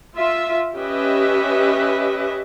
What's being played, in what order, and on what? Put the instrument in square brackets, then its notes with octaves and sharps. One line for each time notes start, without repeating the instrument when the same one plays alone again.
[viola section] F4 E5
C#4 G4 B4 D#5 E5